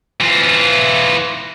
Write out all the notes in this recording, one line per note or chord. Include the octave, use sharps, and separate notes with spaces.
E3 F4